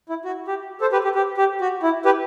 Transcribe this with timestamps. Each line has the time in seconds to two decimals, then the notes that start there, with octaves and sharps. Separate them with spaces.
0.09 E4
0.25 F#4
0.48 G4
0.81 A4 C5
0.92 G4 B4
1.04 G4
1.15 G4
1.37 G4
1.61 F#4
1.83 E4
2.05 G4 B4